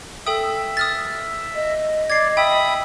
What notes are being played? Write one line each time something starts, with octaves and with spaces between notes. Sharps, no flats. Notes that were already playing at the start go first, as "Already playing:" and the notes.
A4 E5 G5 D#6
D#6 F6 A6
D#5
D5 G#6 C7
E5 G5 B5 D#6